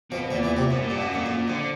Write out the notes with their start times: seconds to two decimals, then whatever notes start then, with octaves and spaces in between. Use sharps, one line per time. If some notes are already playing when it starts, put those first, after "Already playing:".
0.11 F2 B2 F3
0.31 E2 A#2 E3
0.43 E2 E3
0.57 C2 C3
0.71 F#2 A2
0.83 A#2
0.90 G2
0.97 F#2 B2
1.09 F2 A#2
1.26 F#2
1.29 A#2
1.48 F2 D3